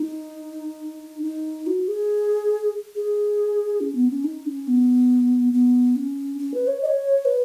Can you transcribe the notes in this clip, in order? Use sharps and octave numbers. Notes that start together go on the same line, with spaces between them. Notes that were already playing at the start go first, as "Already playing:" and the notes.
Already playing: D#4
D#4
F#4
G#4
G#4
C#4
B3
C#4
D#4
C#4
B3
B3
C#4
C#4
B4
C#5
D#5
C#5
B4